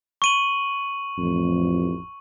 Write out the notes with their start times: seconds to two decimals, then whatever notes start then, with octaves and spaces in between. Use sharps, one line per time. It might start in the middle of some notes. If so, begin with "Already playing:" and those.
0.22 C#6 D#7 F#7
1.18 A1 F2